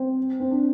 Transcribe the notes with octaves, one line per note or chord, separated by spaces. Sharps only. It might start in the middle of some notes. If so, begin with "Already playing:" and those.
Already playing: C4
C4
D4